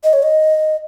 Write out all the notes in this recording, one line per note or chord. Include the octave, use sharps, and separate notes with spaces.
D#5
C#5
D#5